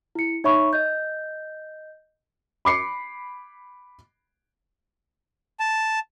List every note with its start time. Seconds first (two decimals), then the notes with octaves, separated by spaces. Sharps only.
0.15 E4 C#7
0.44 D#4 C#5 E5 B5 C#6
0.73 D#5 G6
2.65 B5 D6 C7 C#7
5.59 A5